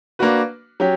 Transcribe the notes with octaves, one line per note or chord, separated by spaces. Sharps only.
A#3 D4 F#4 B4
F#3 C#4 G4